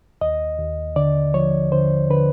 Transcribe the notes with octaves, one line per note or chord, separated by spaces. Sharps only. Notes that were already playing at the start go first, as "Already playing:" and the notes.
D#2 D#5
D#2
D3 D5
F3 C#5
D3 C5
D3 B4